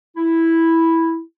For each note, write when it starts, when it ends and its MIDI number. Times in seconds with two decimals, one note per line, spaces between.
0.16 1.21 64